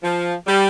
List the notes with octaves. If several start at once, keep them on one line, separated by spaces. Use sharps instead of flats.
F3
G3